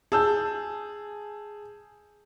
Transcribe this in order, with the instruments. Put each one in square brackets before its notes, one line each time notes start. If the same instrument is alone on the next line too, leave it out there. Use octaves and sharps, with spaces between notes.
[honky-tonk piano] G#4 [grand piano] A5 E6 G6